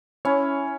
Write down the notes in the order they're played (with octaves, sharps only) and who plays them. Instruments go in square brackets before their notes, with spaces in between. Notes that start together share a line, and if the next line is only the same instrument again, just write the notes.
[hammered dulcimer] C#4 E4 [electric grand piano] C#5